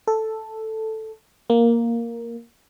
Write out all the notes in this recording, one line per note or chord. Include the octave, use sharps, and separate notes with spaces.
A4
A#3